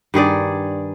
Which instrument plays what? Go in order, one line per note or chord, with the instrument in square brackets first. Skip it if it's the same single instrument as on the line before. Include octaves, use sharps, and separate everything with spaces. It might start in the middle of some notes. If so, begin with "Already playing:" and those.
[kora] G2 D#3 G#4 D5